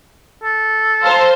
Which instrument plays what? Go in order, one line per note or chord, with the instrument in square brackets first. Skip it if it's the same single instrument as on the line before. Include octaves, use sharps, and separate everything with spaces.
[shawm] A4
[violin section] C5 [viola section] F5 A5 A#5